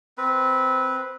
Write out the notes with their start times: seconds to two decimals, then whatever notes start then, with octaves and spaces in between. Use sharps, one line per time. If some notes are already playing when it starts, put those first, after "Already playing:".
0.18 C4 B4